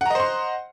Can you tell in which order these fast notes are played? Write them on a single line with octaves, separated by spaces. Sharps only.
F#5 A#5 D#5 C5 C6